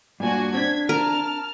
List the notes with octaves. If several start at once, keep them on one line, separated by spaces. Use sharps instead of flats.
G2 A#2 D4 F#4 G#5
C4 D4 G#6 B6
A#4 A5 F6